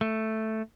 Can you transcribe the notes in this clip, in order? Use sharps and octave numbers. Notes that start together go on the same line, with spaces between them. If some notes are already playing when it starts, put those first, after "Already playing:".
A3